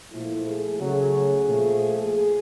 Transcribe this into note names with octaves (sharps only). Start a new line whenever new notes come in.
A#2 F3 A3 E4
G#4
C#3 F#3 A3 G#4
A#2 F3 A3